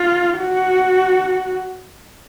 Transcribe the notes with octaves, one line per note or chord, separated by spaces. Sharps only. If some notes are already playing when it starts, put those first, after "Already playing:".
Already playing: F4
F#4